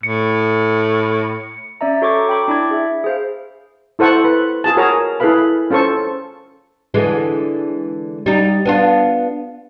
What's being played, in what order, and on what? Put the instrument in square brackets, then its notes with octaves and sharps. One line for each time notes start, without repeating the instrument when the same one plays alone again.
[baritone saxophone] A2 [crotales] C#7
[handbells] C#4 D5 E5 A#5
F#4 A4 C#5 A#5 C#6 D6
G5 B5 D6
D4 E4 D5 B5 G#6
G#4 E5
G#4 C5 F5
[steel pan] E4 A4 C5 F#5 C#6
B4
F4 G#4 A5
F#4 G#4 A#4 C#5 A#5
E4 G#4 A4 B4 F5 B5
C#4 F4 A4 C5 C#6
[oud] D3 E3 G#3
G3 D#4
B3 D4 F4